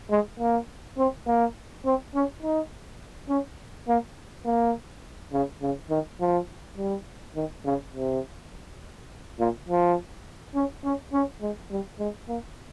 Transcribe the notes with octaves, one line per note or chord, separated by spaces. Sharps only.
G#3
A#3
C4
A#3
C4
C#4
D#4
C#4
A#3
A#3
C#3
C#3
D#3
F3
G3
D#3
C#3
C3
A#2
F3
C#4
C#4
C#4
G#3
G3
G#3
A#3